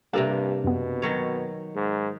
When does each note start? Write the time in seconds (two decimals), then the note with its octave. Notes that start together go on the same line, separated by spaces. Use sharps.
0.13 G2 C3 A#3 D4 G4 A4 F5
0.64 F#2 B2 B3
1.02 D#3 F#3 C#5
1.75 G#2